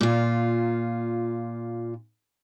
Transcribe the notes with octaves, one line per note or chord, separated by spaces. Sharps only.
A#2 F4